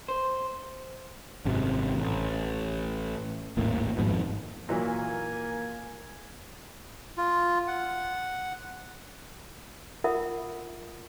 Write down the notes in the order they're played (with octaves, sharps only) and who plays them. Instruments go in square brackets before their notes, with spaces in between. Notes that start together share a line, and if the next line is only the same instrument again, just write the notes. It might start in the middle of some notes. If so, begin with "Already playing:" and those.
[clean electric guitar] C5
[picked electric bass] G#1 F#2 C3
A1
D#1 G#1 A2 A#3
G#1 F2 G#2 B2
[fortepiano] A#2 E3 F#3 [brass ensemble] A#3 A#4 G#5
[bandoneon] F4
F#5
[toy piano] F4 A#4 E5 F#5 D#6